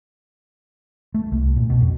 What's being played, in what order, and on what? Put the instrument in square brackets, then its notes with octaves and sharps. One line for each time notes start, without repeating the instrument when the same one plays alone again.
[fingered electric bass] A3
C2
A#2
B2
F2